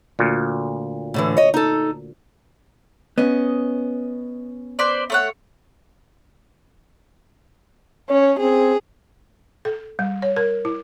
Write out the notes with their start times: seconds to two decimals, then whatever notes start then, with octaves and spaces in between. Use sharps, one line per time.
0.19 D2 A#2
1.14 A2 D3 E3
1.37 C#5 D#5
1.54 D#4 A4
3.18 B3 C#4 D#5
4.79 B4 C5 D5
5.10 A3 C#5 F#5
8.10 C#4 C#5
8.40 C4 G#4
9.65 A4
9.99 G3
10.22 C#5
10.36 A#4
10.65 E4